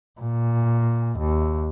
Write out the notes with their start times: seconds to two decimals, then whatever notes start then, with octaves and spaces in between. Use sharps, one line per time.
0.20 A#2
1.19 D#2